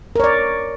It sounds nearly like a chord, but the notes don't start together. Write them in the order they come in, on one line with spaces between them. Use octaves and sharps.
A#4 C#5 D5